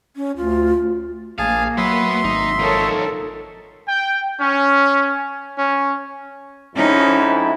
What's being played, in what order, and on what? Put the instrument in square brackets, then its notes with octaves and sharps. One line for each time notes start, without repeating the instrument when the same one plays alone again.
[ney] C#4
[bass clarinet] D2 [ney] F4
[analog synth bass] A#1 [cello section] A#3 [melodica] G#4 G#5 A5 [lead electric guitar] F5
[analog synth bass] F#3 [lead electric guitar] B3 B4 [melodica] E5 C6
[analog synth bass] G#1 [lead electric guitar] D#4
[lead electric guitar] F3 D#4 [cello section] A4 A#4 C#5
[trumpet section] G5
C#4
C#4
[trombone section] F2 G#2 E4 [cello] C#4 D#4